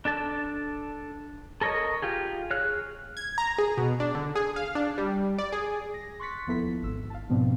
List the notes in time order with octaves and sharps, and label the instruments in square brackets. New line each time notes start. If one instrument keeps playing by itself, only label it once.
[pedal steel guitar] D4 A4 A5
A4 A#4 C#5 D#5
F4 G4 G#4
G#4 C#5 F6 F#6
[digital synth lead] G#6
A#5
G#4
B2
D4
D3
G#4
F5
D4
G3
D5
G#4
[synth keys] A#6
C6 C#6 F#6 A6 B6 C#7
D#2 F3 B3 E4 A4 B6
G#1 E6
F5 A5
G#2 B2 F3 B3 C4 D4